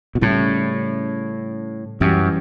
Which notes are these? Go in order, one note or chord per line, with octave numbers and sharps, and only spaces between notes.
B2
A2 C#3 G3 C#4 E4
F#2 E3 G3 C#4 G4